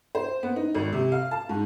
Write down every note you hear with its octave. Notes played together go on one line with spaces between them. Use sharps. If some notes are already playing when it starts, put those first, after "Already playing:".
C5
B3
D#4
G#1
C3
F5
A5
G#2